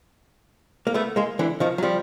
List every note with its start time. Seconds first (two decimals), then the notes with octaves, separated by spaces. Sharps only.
0.87 A#3
0.94 A3 B3
1.16 G#3 A#3
1.39 D3 E3
1.60 D#3 F3
1.78 F#3
1.83 F3 G3